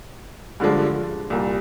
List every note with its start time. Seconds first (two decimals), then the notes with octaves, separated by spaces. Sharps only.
0.60 G2 D3 F3 G#3 D4
1.30 C2 A#2 G3